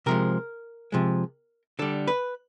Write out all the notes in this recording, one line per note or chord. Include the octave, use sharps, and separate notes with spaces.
C3 F3 G#3 A#4
C3 F3 G#3
D3 G3 A4
B4